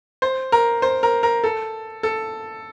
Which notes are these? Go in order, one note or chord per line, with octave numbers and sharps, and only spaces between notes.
C5
A#4
C5
A#4
A#4
A4
A4